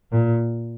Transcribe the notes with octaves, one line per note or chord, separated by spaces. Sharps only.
A#2